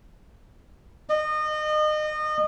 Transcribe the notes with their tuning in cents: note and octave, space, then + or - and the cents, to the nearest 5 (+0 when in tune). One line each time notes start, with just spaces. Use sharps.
D#5 -30